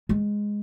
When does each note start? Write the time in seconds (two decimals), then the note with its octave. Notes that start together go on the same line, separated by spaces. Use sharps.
0.09 G#3